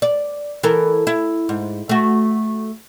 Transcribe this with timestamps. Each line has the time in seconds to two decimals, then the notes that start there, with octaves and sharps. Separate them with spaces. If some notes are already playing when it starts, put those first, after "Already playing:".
0.02 D5
0.63 E3 A4 A#4
1.07 E4
1.49 G#2
1.89 A3 F#4